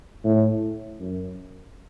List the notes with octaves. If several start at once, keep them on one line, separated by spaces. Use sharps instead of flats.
A2
F#2